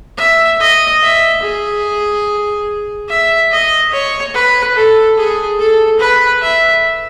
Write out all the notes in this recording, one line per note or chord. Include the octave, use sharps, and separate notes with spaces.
E5
D#5
E5
G#4
E5
D#5
C#5
B4
A4
G#4
A4
B4
E5